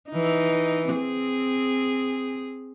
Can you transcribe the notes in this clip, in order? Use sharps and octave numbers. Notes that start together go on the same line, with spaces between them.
E3 D#4
C4 G#4